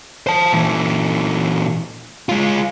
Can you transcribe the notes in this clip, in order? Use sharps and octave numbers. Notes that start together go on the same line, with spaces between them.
C5 A5
A#2 E3
G#3 F4